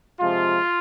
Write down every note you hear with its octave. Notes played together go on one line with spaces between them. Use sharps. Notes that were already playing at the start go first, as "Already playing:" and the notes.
C3 F3 G#3 F4